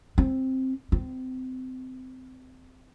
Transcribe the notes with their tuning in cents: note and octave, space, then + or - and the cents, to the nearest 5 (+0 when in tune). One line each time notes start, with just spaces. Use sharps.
C4 +5
C4 -25